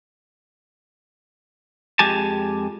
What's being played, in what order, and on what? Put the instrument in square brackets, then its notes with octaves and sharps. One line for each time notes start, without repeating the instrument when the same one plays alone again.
[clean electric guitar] F2 G#3 G4 G#5 A5